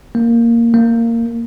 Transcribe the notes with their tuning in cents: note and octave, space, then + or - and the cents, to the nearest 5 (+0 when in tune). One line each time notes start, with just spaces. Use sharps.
A#3 -5
A#3 -15